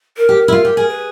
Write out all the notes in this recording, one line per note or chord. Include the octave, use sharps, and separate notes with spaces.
A#4
G4
E4
F4
G4
G#4
B4